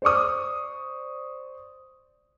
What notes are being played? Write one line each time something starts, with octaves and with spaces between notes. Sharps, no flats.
C5 D5 C#6 D#6